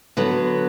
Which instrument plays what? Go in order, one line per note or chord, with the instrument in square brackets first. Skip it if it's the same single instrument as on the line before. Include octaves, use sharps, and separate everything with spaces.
[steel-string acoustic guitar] D3 F#3 B3